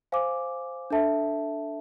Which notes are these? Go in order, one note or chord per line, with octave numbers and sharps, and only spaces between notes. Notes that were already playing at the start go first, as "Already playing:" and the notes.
C5 F5 G#5 D6
D4 A4 E5 A5